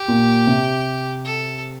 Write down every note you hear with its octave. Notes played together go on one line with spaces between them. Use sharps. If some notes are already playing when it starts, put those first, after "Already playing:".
Already playing: G4
A#2
C3
A4